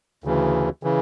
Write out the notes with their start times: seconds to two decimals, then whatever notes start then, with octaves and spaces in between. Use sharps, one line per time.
0.24 D2 C#3 E3
0.83 C#3 E3